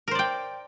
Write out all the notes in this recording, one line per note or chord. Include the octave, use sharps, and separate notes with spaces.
A#4 C5 D5 G5